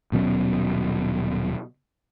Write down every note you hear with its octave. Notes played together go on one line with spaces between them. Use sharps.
D#1 B2 F#3 C#4